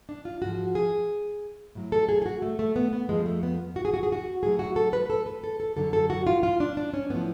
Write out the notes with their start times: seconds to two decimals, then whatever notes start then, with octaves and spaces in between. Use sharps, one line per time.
0.09 D4
0.25 F4
0.42 G#2 F3 F#4
0.75 G#4
1.75 A2 F#3
1.92 A4
2.09 G#4
2.22 G#4
2.26 F#4
2.42 A3
2.59 A3
2.76 B3
2.93 B3
3.09 F2 F3 G#3
3.26 A3
3.43 B3
3.76 F#4
3.85 G#4
3.94 F#4
4.03 G#4
4.12 F#4
4.43 A2 F#3 G#4
4.59 F#4
4.76 A4
4.93 B4
5.10 A4
5.26 B4
5.44 A4
5.60 A4
5.76 F#2 D3 F#3 A4
5.93 A4
6.10 F#4
6.27 F4
6.43 F4
6.60 D4
6.77 D4
6.94 C#4
7.10 A2 F3 B3